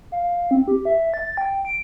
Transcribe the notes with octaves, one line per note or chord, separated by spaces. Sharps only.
F5
C4
G4
E5
A6
G5
D7